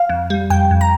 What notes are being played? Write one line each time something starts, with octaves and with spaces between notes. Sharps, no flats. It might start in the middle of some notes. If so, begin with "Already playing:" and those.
Already playing: F5
F2
G3
F2 G5
F2
A#5